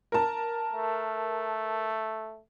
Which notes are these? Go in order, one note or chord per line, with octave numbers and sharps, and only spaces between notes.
A#4 A5
A3